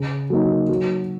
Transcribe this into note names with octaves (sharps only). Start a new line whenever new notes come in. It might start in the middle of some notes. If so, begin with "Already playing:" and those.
Already playing: C#3
F#3 A#3 D#4
F#3